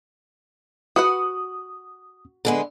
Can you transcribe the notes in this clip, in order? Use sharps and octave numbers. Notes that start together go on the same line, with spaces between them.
F#4 B4 F#5 D#6
D3 G#3 B3